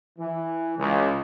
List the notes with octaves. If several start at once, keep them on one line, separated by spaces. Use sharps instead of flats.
E3
C#2